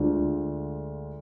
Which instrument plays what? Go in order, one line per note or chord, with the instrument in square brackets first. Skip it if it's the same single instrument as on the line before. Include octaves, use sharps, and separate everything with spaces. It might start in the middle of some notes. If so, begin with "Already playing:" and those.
Already playing: [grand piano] D2 D3 G#3 D4 F4